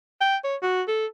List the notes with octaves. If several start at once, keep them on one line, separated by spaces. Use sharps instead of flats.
G5
C#5
F#4
A4